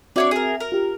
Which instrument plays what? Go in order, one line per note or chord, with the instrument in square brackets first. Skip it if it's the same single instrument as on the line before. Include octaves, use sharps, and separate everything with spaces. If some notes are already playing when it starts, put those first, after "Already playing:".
[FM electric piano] C4 F#4 E5 [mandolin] D4 C#5 D5
[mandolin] G#4 A#4
A#4
[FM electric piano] F4 G4